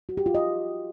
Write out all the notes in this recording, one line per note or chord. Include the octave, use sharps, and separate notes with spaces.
F#4
G4
F4
D#5